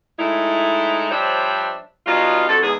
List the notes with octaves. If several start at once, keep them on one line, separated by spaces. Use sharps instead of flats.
A2 G#3 D#4 E4
F3 G3 D4 C5 C#5 E5
B2 F#3 G3 D#4 F4
F2 D3 F#4 A4
E2 G#2 B3 G#4